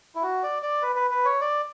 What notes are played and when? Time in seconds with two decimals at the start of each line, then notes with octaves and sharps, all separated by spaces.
0.15 E4
0.22 F#4
0.43 D5
0.63 D5
0.82 B4
0.96 B4
1.11 B4
1.25 C#5
1.41 D5